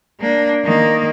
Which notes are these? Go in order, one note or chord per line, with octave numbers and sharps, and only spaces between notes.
A#3 D4
D#3 A#3